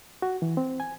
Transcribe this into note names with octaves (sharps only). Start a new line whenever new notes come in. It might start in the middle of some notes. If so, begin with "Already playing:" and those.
F#4
E3
C4
G#5